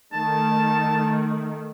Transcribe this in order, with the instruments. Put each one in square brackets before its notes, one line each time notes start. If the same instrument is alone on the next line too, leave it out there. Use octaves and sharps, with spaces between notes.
[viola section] D#3 A3 [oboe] A5